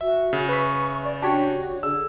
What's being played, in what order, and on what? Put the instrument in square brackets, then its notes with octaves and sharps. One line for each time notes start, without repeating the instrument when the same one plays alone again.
[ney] F#4 [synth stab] E5
[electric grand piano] C#3
[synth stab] B4 E5 [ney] C#6
[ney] D5
[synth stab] D4 G4 C#5 [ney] F#4
[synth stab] D3 [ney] G#4 [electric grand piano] E6